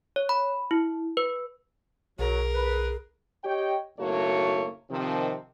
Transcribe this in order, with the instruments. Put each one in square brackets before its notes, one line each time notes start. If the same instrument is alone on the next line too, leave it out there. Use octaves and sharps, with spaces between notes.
[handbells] C#5
B5
E4
B4
[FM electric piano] B1 [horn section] F#3 [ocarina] G#4 [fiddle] A#4
[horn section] B4
[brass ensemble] G4 C#5 D#5 G5
F#1 B1 A3 A#3 F#4 C#5
C3 D#3 F3